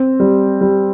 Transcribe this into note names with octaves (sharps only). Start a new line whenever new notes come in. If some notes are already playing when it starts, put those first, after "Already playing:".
Already playing: C4
G3
G3